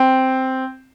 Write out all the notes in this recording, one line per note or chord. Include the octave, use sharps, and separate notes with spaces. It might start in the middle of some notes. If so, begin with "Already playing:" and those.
Already playing: C4